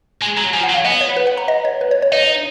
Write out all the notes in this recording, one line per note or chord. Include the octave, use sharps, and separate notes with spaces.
G#3 G#5
F#3 A#5
F3 G#5
F#5
F#3
F5
B3 D#5
C#5
B4
F#5
A#5
D#5
C#5
B4
C#5
C#5
D#4 D#5